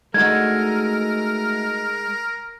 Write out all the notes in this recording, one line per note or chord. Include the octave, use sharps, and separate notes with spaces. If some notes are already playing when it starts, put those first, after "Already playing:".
G#3 A3 D#4 F#4 A#4 G#6